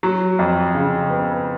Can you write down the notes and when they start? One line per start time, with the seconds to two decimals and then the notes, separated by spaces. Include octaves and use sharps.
0.03 F#3
0.39 F2
0.75 C#3
1.10 B3